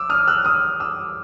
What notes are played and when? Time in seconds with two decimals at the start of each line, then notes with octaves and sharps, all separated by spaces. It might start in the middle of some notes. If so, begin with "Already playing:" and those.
Already playing: D6 E6
0.10 D#6 F6
0.27 E6 F#6
0.45 D#6 F6
0.80 D6 E6